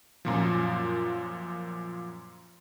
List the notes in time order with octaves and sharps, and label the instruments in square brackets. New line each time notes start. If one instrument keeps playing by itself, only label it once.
[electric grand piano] F#2 A#2 F3